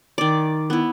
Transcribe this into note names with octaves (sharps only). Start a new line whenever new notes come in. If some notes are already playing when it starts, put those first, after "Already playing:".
D#3 D5
B3 E4